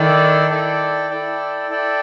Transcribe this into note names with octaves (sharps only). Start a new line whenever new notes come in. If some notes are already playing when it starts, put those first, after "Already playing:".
Already playing: D#3 E4 A4 D5 G5
E4 A4 D5 G5
E4 A4 D5 G5
E4 A4 D5 G5